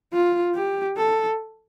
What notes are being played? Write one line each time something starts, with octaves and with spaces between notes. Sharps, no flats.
F4
G4
A4